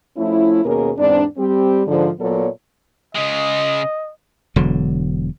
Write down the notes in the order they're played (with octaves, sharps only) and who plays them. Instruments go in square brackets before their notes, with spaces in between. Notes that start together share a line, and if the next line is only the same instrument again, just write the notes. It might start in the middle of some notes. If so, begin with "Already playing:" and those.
[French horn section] F3 A3 C#4 E4
D#2 B2 A#3 C#4 G#4 A#4
E2 G#2 C4 D4
G3 C4 G4
G#2 D3 F3
A#2 F#3 B3 A4 C#5 D5
[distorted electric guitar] C#3 G#3 [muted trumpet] D#5
[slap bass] E1 D3 F#3